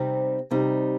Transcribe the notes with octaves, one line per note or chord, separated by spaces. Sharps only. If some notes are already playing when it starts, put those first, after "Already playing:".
Already playing: C3 G3 C4 D#4
C3 G3 C4 D#4